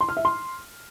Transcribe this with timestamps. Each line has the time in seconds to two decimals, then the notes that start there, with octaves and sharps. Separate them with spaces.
0.01 C6
0.09 F6
0.17 E5
0.25 C6